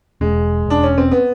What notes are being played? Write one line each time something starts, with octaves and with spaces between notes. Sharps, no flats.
E1 G#3
E1 D4
C#4
C4
B3